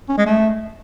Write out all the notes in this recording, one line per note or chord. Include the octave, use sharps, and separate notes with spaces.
C#4
G#3
A3